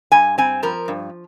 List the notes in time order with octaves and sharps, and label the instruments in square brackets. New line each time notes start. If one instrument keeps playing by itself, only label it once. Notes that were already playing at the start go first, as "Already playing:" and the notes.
[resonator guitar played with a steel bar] G2 G#5
C4 G#5
F3 A#4
G2